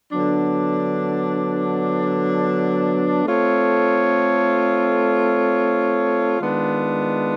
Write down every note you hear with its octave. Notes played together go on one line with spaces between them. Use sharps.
D3 F#3 B3 D4
A3 C4 F4 A4 C#5
D#3 G#3 B3 D4 F4